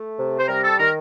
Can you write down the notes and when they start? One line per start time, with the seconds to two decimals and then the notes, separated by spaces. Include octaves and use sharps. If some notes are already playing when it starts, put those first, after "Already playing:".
Already playing: A3
0.18 C3
0.39 C5
0.48 G3 A#4
0.64 A4
0.79 D#3 A#4